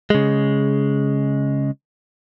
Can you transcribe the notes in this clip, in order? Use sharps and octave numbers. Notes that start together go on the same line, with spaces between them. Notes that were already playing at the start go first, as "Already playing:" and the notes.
C#3 G#3